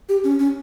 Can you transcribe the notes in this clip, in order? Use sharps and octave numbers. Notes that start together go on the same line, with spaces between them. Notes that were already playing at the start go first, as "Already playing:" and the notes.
G4
C#4
C#4